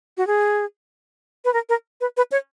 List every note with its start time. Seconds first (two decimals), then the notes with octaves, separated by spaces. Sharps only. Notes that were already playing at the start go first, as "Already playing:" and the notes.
0.17 F#4
0.27 G#4
1.45 B4
1.54 A#4
1.69 A#4
2.01 B4
2.17 B4
2.32 C#5